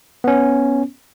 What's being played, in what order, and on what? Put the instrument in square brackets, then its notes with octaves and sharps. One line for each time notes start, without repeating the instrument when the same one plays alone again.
[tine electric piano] B3 C#4